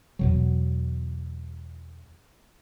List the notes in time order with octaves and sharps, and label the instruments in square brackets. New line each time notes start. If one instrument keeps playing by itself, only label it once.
[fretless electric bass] E2 B2 F#3